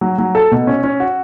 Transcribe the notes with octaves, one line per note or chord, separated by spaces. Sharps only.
F#3
F#3
A4
B2
C#4
C#4
F#4